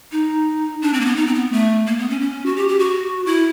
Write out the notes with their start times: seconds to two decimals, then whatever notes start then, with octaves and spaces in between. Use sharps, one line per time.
0.12 D#4
0.82 D4
0.93 C4
1.01 A#3
1.05 B3
1.16 D#4
1.27 C4
1.34 B3
1.52 A3
1.87 A#3
1.98 B3
2.10 C#4
2.21 C#4
2.46 F#4
2.56 G4
2.68 G4
2.79 F#4
3.26 E4